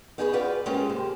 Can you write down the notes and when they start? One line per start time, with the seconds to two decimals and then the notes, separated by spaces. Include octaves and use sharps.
0.18 B3 D#4 F#4 G#4 A#4 B4
0.33 F4 F#4 B4 D5 F5 G5
0.66 G#3 A#3 C4 C#4 F4 G4
0.89 D#2 C3 C5